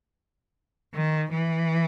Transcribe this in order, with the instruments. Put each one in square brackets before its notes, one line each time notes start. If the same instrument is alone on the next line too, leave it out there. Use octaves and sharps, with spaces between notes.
[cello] D#3
E3